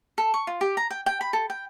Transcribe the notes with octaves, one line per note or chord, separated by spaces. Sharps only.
A4
C#6
F4
G4
A#5
G5
G5
B5
A4
G5